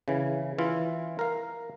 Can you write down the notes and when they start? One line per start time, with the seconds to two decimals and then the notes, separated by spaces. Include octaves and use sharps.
0.08 C#3 E3
0.59 E3 E4 F4
1.19 A#4 F5